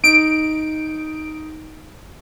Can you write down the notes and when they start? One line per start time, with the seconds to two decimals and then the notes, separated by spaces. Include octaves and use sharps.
0.04 D#4 D7